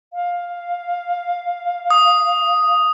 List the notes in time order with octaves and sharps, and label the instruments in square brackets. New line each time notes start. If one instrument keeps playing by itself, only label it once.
[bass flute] F5
[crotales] D#6